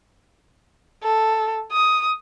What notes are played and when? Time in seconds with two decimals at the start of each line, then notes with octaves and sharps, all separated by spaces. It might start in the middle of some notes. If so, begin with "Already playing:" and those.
1.04 A4
1.72 D#6